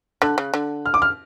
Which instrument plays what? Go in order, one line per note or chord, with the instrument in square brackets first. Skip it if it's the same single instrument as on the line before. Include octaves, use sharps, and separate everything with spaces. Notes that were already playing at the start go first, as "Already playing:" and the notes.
[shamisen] D3 [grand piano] F#6
[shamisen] C#3
D3
[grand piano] F6
D6
F6